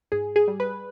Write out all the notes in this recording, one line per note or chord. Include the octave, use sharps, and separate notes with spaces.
G#2 G#4
G#4
G3
B4